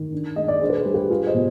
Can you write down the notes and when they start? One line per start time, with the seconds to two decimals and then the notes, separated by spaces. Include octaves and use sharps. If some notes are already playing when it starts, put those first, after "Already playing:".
Already playing: D#3
0.13 D4
0.36 G#3 D#5
0.48 D5
0.61 D4 G#4 C5
0.70 B4
0.77 G#4 C5
0.86 G3
0.94 G4 B4
1.10 G#3 F4 G#4
1.26 C5 D#5
1.34 B2